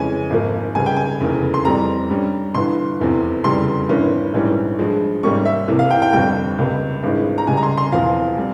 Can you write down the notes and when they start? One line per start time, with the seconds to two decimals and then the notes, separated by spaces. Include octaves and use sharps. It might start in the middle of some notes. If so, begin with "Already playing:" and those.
Already playing: F2 C#3 E3 G#3 C#4 G#5
0.30 G#1 G#2 F3 A#3
0.75 C#2 C#3 G3 G#5
0.86 G5
0.97 G#5
1.20 F1 E2 C#3 E3 A#3
1.54 C6
1.65 F2 E3 G3 C4 A#5
2.10 G2 G3 C#4
2.55 G1 G2 E3 C6
3.00 F1 E2 C3
3.44 F1 E2 C#3 G3 C6
3.89 G#1 G2 E3 A#3 C#4
4.33 A#1 G#2 E3 G3 C#4
4.79 G2 F3 G#3
5.23 G#1 G#2 G3 A#3 C#4 C#6
5.45 E5
5.68 C2 C3 E3 A#3
5.79 F5
5.90 G5
6.02 G5
6.13 G1 F2 C3 G3 G5
6.58 C#2 C3 G3 A#3
7.03 G#1 G2 E3 G#3
7.38 A#5
7.47 C#2 C#3 G3 G#5
7.57 A#5
7.63 C6
7.77 C6
7.92 E1 E2 C3 F3 F5
8.37 G3 C4